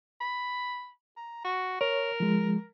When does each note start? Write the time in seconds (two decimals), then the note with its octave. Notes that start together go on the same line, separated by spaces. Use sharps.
0.21 B5
1.17 A#5
1.45 F#4
1.81 A#4 C#5
2.20 F3 G#3